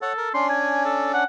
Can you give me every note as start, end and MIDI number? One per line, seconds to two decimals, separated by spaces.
0.02 0.32 69
0.02 0.13 73
0.02 0.13 78
0.17 0.29 70
0.34 1.24 61
0.34 1.24 62
0.34 0.47 84
0.49 0.82 80
0.85 1.12 69
1.14 1.24 78